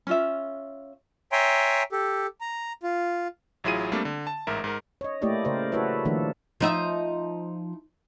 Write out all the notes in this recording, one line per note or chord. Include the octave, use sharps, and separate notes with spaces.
C#4 F4 E5
C#5 E5 G5 G#5 A#5 C6
G4 A4
A#5
F4
A1 F#3 E4 F4 G#4 D#7
G3 A3 A#3 C4 D4
D3
A5
A1 G#2 A#4 E5
G#2 A#4
C#5 D#5
A3 A#3 E4 G4 D5 D#5
C#3 A#4 C5 D5
E4 F#4 A4 B4 C#5 E5
D#3 F3 A3 A#3 D4 A4
F3 D#4 E5